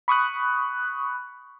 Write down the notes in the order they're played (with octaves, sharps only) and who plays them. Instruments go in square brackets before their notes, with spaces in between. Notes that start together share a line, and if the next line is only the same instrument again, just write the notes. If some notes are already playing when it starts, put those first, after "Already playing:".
[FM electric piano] B5 C#6 D#6 F#6